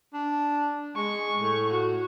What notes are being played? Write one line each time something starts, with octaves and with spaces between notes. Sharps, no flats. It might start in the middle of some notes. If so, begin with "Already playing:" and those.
D4
G#3 C#6
A2
F#4